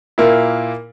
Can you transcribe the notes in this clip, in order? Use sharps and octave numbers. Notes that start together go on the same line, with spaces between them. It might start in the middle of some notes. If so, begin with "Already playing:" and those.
A#2 A#3 E4